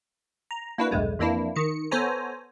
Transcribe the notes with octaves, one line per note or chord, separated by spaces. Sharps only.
A#5
A#3 D4 E4 F#4 B4
B1 E2 G2 G#3 A3
F2 E3 A#3 D4 E4
D#3 C#7
B3 A4 C5 C#5 G#5 A#5